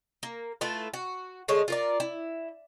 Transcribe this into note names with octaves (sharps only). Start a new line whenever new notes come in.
A#3
A3 E4 F4 B4
F#4
D3 G#3 A3 C#5
F4 A#4 D5
E4